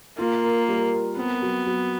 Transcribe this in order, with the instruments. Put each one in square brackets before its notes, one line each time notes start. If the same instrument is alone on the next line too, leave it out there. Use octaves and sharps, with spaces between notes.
[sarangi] A#3 [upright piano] F4
[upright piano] A#4
G3
A#4
[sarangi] B3 [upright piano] C4
[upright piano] F#3
F#3